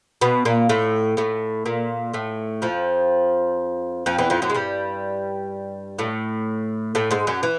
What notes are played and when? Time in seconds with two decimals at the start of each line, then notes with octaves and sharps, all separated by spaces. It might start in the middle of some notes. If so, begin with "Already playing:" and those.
0.21 B2 B3
0.45 A#2 A#3
0.69 A2 A3
1.17 A2 A3
1.66 A#2 A#3
2.14 A2 A3
2.62 F2 F3
4.06 F2 F3
4.18 E2 E3
4.30 F2 F3
4.42 F#2 F#3
4.50 G#3
4.55 G2 G3
5.99 A2 A3
6.95 A2 A3
7.11 G#2 G#3
7.27 F#2 F#3
7.43 E3